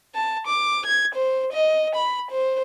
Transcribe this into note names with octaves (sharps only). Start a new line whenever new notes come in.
A5
D6
G#6
C5
D#5
B5
C5